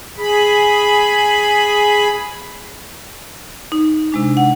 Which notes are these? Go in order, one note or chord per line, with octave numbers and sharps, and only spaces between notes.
G#4 B5
D#4
C3 G#3 D4
F#5